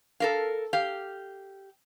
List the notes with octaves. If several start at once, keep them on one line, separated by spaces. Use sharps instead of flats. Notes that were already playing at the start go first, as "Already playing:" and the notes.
A4 A#4 F5
G4 F5